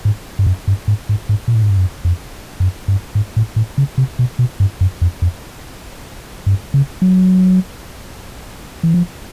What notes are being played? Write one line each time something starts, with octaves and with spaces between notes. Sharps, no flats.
G#2
G2
F#2
G2
G#2
G#2
G#2
A#2
A2
G#2
G2
F#2
F2
F#2
G2
G#2
A2
A2
C#3
C3
B2
B2
G2
F#2
F2
F2
G2
C#3
F#3
E3
F3